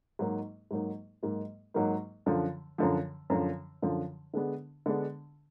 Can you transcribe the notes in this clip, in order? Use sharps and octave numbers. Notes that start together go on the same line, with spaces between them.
G#2 F#3 A#3 D#4
G#2 F#3 A#3 D#4
G#2 F#3 A#3 D#4
G#2 F#3 A#3 D#4
F#2 D3 F3
F#2 D3 F3
F#2 D3 F3
F#2 D3 F3
D3 G#3 B3 D4
D3 G#3 B3 D4